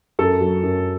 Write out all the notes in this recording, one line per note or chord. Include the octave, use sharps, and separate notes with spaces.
F#2 A4
F#3
F#2